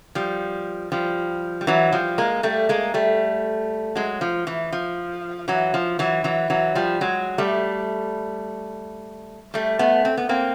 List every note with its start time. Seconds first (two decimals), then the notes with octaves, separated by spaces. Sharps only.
0.15 F3 G3
0.92 F3 G3
1.61 G3
1.67 E3 F#3
1.92 F3 G3
2.18 G#3 A#3
2.43 G3 A3
2.69 G#3 A#3
2.94 G3 A3
3.95 F#3 G#3
4.21 F3
4.47 E3
4.72 F3
5.48 E3 F#3
5.74 F3
5.99 E3 F#3
6.24 E3 F#3
6.50 E3 F#3
6.75 F3 G3
7.01 F#3 G#3
7.38 G3 A3
9.54 G3 A3
9.79 A3 B3
10.05 C4
10.17 B3
10.29 A#3 C4